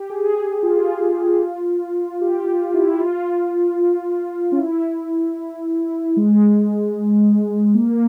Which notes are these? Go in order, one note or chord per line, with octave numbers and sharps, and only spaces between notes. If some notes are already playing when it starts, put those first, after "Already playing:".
Already playing: G4
G#4
F4
G4
F4
E4
F4
C#4
E4
G#3
A#3